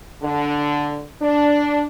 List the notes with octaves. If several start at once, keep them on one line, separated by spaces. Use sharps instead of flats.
D3
D4